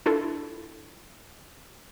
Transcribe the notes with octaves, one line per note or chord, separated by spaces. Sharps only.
D4 E4 F4 A4